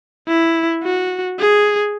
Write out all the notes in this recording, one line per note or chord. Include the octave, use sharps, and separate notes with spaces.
E4
F#4
G#4